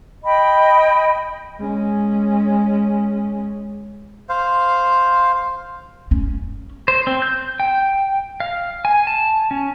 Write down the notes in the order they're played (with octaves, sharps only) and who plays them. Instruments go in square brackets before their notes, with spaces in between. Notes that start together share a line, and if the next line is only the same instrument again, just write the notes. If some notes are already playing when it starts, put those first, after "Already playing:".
[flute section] D#5 G5 B5
[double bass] G#3 C#4
[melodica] C5 F5
[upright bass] C#4
[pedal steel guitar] C5
C4
G6
G5
F5
G#5
A5
C#4